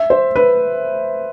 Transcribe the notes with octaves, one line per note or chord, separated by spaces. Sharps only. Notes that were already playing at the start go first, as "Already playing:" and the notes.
Already playing: E5
C5
B4